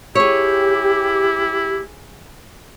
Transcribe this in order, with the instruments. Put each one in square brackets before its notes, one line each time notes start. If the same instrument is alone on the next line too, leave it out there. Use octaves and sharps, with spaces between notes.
[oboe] E4 [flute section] G4 [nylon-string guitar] G#4 C#5